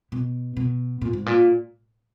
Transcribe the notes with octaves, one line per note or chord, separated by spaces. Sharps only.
B2
B2
A#2
G#2
A#2